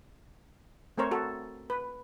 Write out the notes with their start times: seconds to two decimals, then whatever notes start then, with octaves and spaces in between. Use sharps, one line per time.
0.98 A3 C4 A#4 C5 C#5
1.11 F#4 A4
1.70 B4